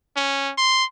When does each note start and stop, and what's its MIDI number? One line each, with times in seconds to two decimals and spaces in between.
0.16 0.52 61
0.57 0.84 84